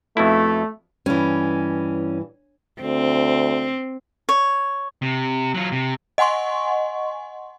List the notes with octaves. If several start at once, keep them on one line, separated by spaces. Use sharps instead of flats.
F2 B2 A3 E4
G2 E3 C#4
D2 C4
C#5
C3
F#3 F4
C3
D#5 F#5 G#5 C6 C#6